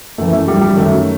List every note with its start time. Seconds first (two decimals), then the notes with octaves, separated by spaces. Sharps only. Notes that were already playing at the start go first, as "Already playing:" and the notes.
0.18 F#2 E3 A3
0.33 A3
0.48 G3
0.61 G3
0.77 F#2 D#3 F#3 A3